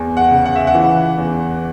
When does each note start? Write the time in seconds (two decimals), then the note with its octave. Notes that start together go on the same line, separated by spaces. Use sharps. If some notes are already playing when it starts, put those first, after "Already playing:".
Already playing: E2
0.17 F#5
0.31 C#3
0.46 F#5
0.56 E5
0.67 F#5
0.75 E3
1.17 E2